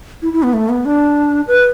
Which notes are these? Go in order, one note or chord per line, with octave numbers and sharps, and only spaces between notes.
E4
E4
B3
A3
B3
D4
B4